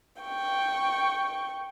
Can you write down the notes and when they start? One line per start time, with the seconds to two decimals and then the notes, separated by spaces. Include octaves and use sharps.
0.22 G5 C#6